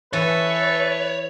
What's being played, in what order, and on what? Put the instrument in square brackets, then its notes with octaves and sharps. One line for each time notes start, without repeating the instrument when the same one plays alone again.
[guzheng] E3 [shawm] A4 [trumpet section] B4 [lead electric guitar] C#5